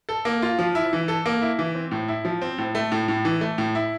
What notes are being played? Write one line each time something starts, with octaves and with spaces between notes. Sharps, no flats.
A4
A#3
F4
F3
E4
E3
A4
A#3
E4
E3
C4
A2
E4
F3
C4
A2
A3
A2
A2
E3
A3
A2
E4